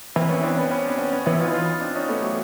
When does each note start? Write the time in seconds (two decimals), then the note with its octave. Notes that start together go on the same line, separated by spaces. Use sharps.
0.15 E3 A#3 C4
0.29 B3 C#4
0.43 C4 D4
0.57 B3 C#4
0.71 B3 C#4
0.85 C4 D4
0.98 B3 C#4
1.12 B3 C#4
1.26 E3 B3 C#4
1.40 D#4 F4
1.53 D#4 F4
1.81 C4 D4
1.95 C#4 D#4
2.09 A3 B3
2.22 E3 F#3